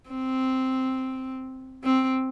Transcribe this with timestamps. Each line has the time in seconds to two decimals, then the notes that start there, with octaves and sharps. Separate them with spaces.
0.10 C4
1.84 C4